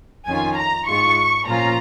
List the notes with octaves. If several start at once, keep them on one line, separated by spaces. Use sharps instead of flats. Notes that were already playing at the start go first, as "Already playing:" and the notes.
F2 D#3 C#4 F4 G#5
A#5
G#2 G#3 F4 C#6
A#2 F3 C#4 F4 A#5